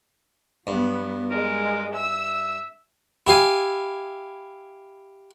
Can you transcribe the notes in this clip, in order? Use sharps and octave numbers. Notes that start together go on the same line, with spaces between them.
G2 F#3 B3
G#3 A#4
E5 E6
E4 G4 F5 G#5